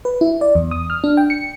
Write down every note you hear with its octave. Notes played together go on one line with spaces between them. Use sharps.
B4
E4
D5
E2
D#6
F6
D4
G5
C#7